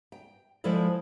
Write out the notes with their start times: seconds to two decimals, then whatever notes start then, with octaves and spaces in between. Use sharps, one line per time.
0.12 G5
0.64 F3 G#3 E4 A4 D5